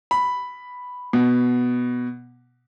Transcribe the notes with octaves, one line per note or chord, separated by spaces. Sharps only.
B5
B2